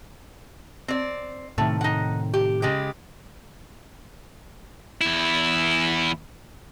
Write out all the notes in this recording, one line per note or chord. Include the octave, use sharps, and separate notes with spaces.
C4 D5
A2 C3 D#3 A3
D#4 F#5
G4
C#3 G#3 G4
E2 E4